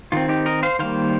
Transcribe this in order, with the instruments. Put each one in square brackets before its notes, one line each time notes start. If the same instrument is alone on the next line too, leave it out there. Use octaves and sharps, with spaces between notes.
[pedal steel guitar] D#3 C4 F4
D#4 G4
A#4 D#5
C5 F5
D#3 G3 A#3 C5 F5